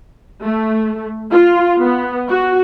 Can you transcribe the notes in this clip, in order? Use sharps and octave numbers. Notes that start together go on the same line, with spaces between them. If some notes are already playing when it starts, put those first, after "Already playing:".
A3
F4
B3
F#4